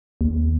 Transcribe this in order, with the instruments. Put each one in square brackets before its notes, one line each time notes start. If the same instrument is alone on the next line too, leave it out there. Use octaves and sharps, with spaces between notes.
[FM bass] D#2